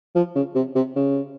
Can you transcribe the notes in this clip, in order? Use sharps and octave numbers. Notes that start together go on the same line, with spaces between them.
F3
C#3
C3
C3
C#3